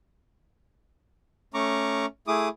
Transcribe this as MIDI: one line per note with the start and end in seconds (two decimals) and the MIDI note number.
1.54 2.06 57
1.54 2.06 61
1.54 2.06 82
1.54 2.06 85
1.54 2.06 86
2.28 2.49 57
2.28 2.49 64
2.28 2.49 68
2.28 2.49 86
2.28 2.49 87